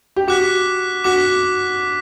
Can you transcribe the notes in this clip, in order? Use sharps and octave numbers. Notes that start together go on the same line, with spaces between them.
G4
F#4 D6 F#6 B6
F#4 D6 F#6 B6